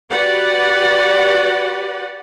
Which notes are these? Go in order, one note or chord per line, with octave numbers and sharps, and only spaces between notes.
F#4 G4 B4 D5 F#5